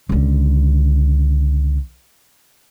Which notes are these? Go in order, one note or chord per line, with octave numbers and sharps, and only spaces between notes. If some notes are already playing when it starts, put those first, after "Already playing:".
C#2 D3